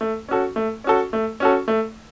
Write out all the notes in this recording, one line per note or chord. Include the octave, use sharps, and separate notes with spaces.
A3
C#4 F#4 A4
A3
C#4 F#4 A4
A3
C#4 F#4 A4
A3